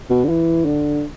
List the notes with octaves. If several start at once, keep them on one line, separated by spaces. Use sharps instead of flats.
B2
D3
E3
D3